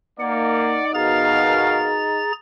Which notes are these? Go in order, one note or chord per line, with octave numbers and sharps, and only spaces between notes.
A#3 D#4 D5 F#5
B2 G#4 A#4 F5 A#5 A6